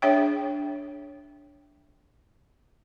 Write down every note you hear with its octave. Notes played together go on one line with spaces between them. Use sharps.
D4 G#4 C#5 E5 G5